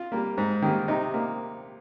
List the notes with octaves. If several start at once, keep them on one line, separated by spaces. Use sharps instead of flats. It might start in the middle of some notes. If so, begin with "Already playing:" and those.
Already playing: F4
G3 A#3
G#2
D#3 G3 A#3
C3 D#4
A#3